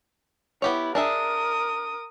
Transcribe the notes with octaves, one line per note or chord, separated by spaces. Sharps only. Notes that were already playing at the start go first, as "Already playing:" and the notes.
B3 E4 G4 C#5
D4 G#4 A#4 E5 D#6